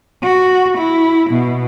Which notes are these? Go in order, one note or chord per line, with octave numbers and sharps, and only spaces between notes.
F#4
E4
B2